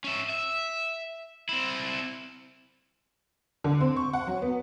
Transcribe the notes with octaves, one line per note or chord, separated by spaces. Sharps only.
C#4 E5
E5
C4 E4
D3
C4
C#6
F#5
F#3
B3